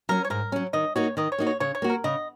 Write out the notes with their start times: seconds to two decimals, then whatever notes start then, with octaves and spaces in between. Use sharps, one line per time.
0.09 F#3 C#4 A#4
0.25 C#5
0.30 G#2 A#4
0.52 F#3 C#4
0.73 D#3 D#5
0.96 A#3 D#4 F#4 C#5
1.17 D#3 D#5
1.32 C#5
1.38 A#3 D#4 F#4
1.47 C#5
1.60 C#3 C#5
1.75 C#5
1.82 A#3 F#4
1.90 A#4
2.04 C#3 D#5